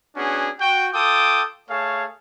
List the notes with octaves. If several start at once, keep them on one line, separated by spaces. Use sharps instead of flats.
B3 C#4 D4 F#4 G#4
F#4 G5
F4 A4 G5 D6 D#6
A3 G#4 C#5 F5 A5